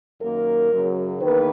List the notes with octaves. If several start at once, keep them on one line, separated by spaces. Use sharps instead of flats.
F#2 D#3 A#3 A#4
F#2 C#3 F#3
E2 D#3 A#3 B4